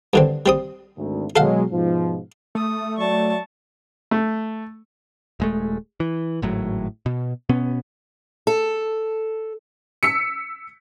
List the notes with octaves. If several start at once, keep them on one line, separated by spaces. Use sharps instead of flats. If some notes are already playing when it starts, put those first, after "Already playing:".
G2 D3 C4
G3 C4 D#6
G#1 D2
B2 F#3 G#3 A4 F5 F#5
G#2 B2 F3
A3 D#6
F#3 D5 A5 C#6
A3
D#1 G#3 A3
E3
G#1 A2 F#3
B2
B2 B3 C#4
A4
E6 B6 C#7